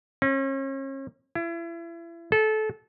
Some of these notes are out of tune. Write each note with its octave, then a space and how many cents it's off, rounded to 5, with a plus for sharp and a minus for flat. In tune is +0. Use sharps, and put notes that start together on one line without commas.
C#4 -40
E4 +35
A4 -25